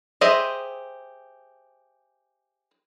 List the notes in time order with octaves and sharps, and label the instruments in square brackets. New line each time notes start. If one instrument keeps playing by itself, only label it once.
[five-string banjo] G4 G#4 C5 D#5 E5